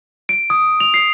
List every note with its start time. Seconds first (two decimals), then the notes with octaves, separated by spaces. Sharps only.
0.29 D7
0.50 D#6
0.80 F7
0.94 C7